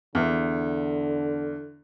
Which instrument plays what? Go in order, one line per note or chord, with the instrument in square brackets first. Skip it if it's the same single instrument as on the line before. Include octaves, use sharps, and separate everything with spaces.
[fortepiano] E2 [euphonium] D3